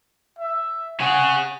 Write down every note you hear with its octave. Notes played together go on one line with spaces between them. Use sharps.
E5
G#4 C#5 F#5